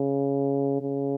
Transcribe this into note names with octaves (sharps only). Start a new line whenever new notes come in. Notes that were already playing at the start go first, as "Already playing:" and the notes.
Already playing: C#3
C#3